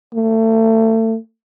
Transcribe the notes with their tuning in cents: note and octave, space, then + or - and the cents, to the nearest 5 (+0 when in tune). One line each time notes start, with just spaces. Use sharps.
A3 +30